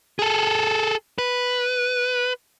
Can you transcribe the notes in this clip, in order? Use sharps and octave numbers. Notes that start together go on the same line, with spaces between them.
G#4 A4
B4